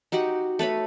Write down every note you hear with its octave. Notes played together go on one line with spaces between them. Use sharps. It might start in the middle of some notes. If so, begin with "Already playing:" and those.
D#4 F#4 G4 F#5
A3 B4 C#5 B5